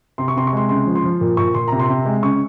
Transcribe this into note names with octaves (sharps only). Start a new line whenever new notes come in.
C3 C6
C#6
C3 C6
C#6
G#3 C6
C#3 C6
F3
C6
F3
A#2
A#2 C#6
A#2 C6
C3 A#5
C6
C3
G#3
C#3 C#6